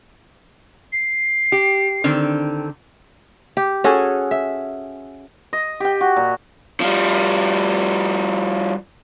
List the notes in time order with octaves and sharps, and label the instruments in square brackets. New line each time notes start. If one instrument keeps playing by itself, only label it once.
[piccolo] C7
[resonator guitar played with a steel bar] G4
D3 D#3 C4
[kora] G4
C#4 F#4 G#4 A4
E5
[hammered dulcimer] D#5
G4 G5
F#4
A#2
[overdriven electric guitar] F3 G3